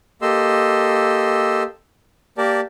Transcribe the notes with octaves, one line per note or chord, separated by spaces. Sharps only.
A#3 G4 A4 D#5 C6 E6
A#3 G4 A#4 D5 A5